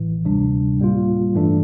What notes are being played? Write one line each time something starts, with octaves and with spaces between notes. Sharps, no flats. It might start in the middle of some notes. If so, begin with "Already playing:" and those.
Already playing: A1 A2 E3
D2 C3 G3 D4
A2 G3 A#3 F4
G2 E3 A3 D4 A4